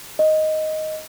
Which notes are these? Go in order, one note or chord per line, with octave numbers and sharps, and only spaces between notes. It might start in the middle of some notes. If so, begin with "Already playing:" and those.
D#5